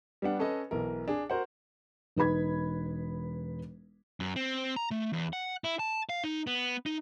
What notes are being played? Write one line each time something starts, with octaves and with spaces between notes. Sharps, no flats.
G3 B3 D4 F#5
C#4 A4 B4 D#5
B1 E3 A#4
D4 G#4 G#5
F#4 A#4 C5 F#5
E1 D#4 B4 B5 G#6
F#2
C4
A#5
A3
E2
F#5
E4
A5
F5
D#4
B3
D#4